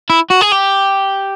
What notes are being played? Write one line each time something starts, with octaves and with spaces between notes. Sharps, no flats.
E4
F#4
G#4
G4